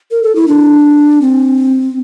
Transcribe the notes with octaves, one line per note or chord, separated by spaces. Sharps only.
A#4
A4
E4
D4
C4